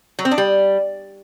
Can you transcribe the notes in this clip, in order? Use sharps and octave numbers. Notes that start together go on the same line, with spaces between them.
F#3
C4
D4
G3